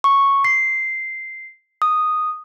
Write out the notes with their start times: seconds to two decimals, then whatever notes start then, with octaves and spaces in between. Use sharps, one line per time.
0.04 C#6
0.44 C7
1.82 D#6